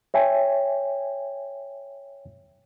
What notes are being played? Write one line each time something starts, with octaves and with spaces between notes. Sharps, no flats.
C#5 E5 G5 G#5